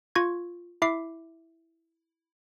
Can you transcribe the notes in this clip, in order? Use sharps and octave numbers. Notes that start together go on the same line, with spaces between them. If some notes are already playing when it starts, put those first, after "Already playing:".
F4 C#6 G#6
E4 E5 D6 C7